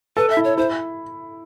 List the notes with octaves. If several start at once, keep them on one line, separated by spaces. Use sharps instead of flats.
A4 B4
E5
E4
C#5
E4 C5